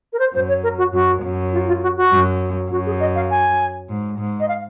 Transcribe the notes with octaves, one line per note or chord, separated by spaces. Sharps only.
A#4
C5
F#2 C5
C#5
A#4
F#4
F#2 F#4
F#2
F4
F4
F#4
F#4
F#2
F#2 F#4
G#4
D#5
F5
G#5
G#2
G#2
D#5
F5